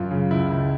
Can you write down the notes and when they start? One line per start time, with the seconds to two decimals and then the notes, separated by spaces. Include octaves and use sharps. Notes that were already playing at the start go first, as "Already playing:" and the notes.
Already playing: F#2 F4
0.11 C#3
0.31 C#2 E4
0.51 C#2